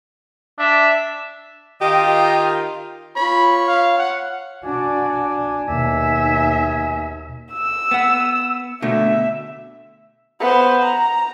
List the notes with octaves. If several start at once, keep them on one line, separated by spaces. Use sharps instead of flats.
D4 E5
D#3 F4 G4 D#5
F4 C#5 B5
F5
F#5
D4 F#4 D5 G#5
D#2 B2 D#4 E5
E6
B3 F#5
B2 D3 A3 E5
B3 C5
A#5